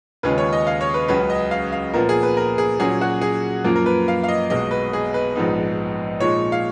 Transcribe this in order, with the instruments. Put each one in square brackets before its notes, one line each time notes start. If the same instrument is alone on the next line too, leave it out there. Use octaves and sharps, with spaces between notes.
[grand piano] D#2 C#3 G#3 C#4 F4 B4
C#5
D#5
F5
C#5
B4
C#2 C#3 F#3 C#4 B4
D#5
F5
F5
A#2 F3 B3 A#4
G#4
B4
A#4
G#4
A#2 F#3 C#4 G#4
F#4
G#4
F#2 F3 A#3 F4
A#4
B4
F5
F5
D#5
B1 B2 G#3 D#5
B4
G#4
B4
A#1 G#2 F3 B3 D#4
A#2 F3 G#3 D#4 C#5
F5